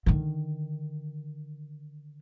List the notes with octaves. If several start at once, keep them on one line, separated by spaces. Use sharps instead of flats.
D3 D#3